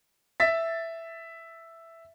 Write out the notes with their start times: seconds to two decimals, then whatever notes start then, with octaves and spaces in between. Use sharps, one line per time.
0.40 E5 A6 B6